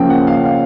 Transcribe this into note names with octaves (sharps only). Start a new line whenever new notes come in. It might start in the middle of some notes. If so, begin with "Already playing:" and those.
Already playing: C#3 F3 A#3 C#4 G5
F#5
F5
F5